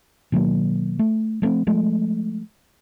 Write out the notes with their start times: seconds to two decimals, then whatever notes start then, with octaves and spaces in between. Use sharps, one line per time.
0.32 B2 D#3 F#3 A#3
0.99 A3
1.42 F3 A3 B3 C4
1.67 F3 G#3 A3